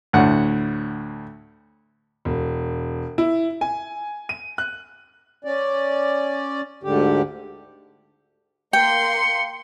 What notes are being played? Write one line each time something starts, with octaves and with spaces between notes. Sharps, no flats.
D2 A2 F#5
E1
E4
G#5
D#7
F#6
C#4 D5
D2 G#2 D3 G4
A#3 G5 C6 C#7